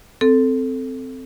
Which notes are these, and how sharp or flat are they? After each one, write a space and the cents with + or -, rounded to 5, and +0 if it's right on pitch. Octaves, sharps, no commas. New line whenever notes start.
C4 -10 A4 +0